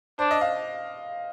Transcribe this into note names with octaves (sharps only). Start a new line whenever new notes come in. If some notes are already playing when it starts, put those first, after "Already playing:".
D4 C5
D#5
F5